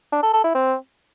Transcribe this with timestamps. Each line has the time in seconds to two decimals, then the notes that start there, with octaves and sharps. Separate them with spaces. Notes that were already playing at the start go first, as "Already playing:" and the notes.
0.12 D4
0.23 A4
0.34 A4
0.44 E4
0.55 C4